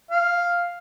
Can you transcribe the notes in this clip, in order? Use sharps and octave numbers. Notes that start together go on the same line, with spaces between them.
F5